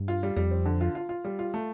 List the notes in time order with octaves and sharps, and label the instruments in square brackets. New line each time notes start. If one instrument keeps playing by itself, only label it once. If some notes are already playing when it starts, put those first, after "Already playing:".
Already playing: [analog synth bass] G2
[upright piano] F4
G3
[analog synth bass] F2 [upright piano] G3
[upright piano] C4
D3
F4
F4
F4
G3
F4
A3